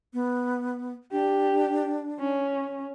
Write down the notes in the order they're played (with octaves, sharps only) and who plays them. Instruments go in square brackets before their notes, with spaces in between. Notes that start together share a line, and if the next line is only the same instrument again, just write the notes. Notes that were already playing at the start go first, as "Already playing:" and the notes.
[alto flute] B3
[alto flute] D4 [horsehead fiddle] G4
[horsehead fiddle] C#4